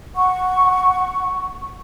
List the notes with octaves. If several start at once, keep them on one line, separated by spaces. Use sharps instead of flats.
F#5 C#6